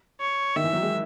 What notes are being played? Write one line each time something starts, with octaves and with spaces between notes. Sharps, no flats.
C#5
D#3 E5
E3
F#3
G#3